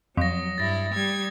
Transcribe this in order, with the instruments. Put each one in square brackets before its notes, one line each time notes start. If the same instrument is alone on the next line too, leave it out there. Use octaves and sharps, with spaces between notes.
[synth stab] F2 [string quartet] F#3 [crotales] D#6 A#6
[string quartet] G2 E4 [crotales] A6 A#6
[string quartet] G3 G#6